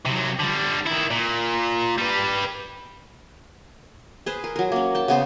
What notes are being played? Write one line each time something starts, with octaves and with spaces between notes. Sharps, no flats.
C3 F#3
D3 G3
D#3 E4
A#2
G3 B4
G#4 B4 C5
A#4
F#3 A#4
A#3 C#4
G5 A5
C#3 B3 C5